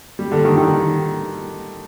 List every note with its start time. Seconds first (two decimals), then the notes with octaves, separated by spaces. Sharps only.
0.19 G3
0.32 D3
0.45 D#3
0.57 D#3